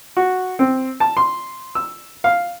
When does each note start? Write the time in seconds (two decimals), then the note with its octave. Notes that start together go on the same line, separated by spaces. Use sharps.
0.17 F#4
0.59 C4
1.00 A5
1.17 C6
1.75 E6
2.24 F5